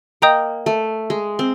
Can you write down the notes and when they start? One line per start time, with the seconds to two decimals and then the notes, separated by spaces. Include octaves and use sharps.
0.22 A#3 D#5 G5 A#5 D#6 G6
0.66 A3
1.10 G#3
1.39 C4